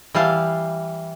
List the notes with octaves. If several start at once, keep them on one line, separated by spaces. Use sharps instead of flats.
E3 G3 F5 A5